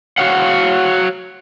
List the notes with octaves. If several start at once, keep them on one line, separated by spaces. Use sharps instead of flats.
F#4 C#5 F5 F#5